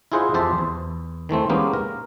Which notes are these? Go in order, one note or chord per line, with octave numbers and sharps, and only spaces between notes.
E4 F4 G#4 C5 D#5 F#5
F2 G4 C5 E5 A5
E2
D#3 E3 A3 C4
G#3 A#3 B3 C#4 D#4 G4
A#4